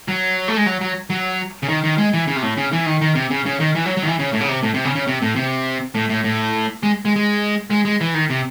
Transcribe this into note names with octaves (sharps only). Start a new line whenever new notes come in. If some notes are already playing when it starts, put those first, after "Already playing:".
F#3
A3
G#3
F#3
F#3
F#3
C#3
D#3
D#3
G#3
E3
C#3
C3
A2
C#3
E3
D#3
D#3
C3
C#3
C#3
D#3
E3
F#3
F#3
D#3
E3
C#3
A2
C#3
C3
A2
C3
C#3
C#3
C3
A2
C3
A2
A2
A2
G#3
G#3
G#3
G#3
G#3
E3
D#3
C3